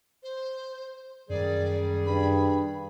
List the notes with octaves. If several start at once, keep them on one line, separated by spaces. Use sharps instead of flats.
C5
F#2 D#3 G3 G#4 D5
G2 B5